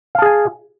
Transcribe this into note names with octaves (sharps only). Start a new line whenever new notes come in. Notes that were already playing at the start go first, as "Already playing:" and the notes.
G#4 F5 G#5 A5